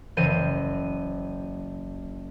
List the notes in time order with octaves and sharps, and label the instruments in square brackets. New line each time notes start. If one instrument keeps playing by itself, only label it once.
[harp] F#1 E3 C5 D#7